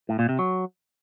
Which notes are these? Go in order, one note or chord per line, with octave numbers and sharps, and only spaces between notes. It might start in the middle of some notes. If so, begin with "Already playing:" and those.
A2
A#2
C3
F#3